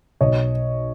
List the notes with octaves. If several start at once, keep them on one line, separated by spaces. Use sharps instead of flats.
B1 C#5 D#5